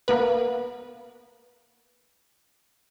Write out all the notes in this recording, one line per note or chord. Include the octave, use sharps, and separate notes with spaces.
A#3 B3 B4